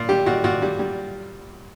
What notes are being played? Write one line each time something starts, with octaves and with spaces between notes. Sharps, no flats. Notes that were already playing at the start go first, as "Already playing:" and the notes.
Already playing: A#2
G3 G4
A#2 F#4
A#2 F#4
G3
G3